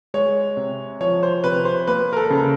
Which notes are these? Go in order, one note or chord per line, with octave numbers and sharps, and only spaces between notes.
G#3 C#5
C3
F3 C#5
C5
C3 B4
C5
A#3 B4
A#4
A4
C#3